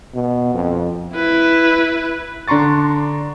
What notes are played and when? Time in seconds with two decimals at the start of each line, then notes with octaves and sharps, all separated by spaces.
0.14 B2
0.54 F2
1.15 E4 B4
2.48 D3 D4 A#5 C6 C#6 A6